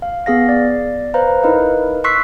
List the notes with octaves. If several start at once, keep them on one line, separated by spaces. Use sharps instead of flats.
F5
B3 G#4 F5 A#6
D5
B4 C5 F5 A#5
D#4 E4 A#4 B4 D#5 F5
C6 C#6 E6 F#6 B6 C7